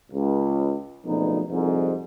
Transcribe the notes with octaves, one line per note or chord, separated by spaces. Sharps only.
C#2
F#1 D2 B2 F3 B3 D#4
C2 F2 G#2